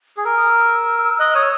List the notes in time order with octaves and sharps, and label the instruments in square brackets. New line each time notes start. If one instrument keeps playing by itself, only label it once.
[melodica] G#4
[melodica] A#4 [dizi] E6
[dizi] D#6
E6
[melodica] D#5 [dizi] F#6
[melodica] C#5 [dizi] D#6
[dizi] E6